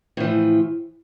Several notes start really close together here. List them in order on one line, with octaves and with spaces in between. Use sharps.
A2 F3 E3